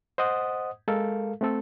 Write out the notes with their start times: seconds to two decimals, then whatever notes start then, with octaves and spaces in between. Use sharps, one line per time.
0.18 C5 D#5 F#5 D#6
0.88 G#3 A4 A#4 F5
1.41 A3 C4 A4